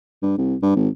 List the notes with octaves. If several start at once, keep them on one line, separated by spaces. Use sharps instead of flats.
G2
C2
G2
G#1